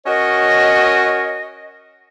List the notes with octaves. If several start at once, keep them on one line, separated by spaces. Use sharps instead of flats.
C#4 F#4 A#4 C#5 D#5